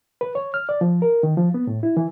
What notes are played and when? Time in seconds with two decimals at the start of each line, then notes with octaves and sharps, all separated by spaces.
0.21 B4
0.35 C#5
0.54 F6
0.69 D5
0.81 F3
1.02 A#4
1.23 D#3
1.37 F3
1.54 B3
1.67 A2
1.83 E4
1.97 E3